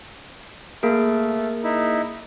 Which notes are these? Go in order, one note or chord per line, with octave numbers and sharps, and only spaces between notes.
A3 A#3 G#4 A#4
D#4 E4